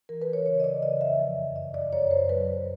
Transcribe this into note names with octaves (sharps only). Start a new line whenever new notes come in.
E3 A#4
B4
E3
C#5
C#3 C#5
D#5
E3 D5
C#3 D#5
F2 E5
F3
F#2
F#2 D#5
F#2 D5
F#2 C#5
F#2 C5
F#3 B4
F#3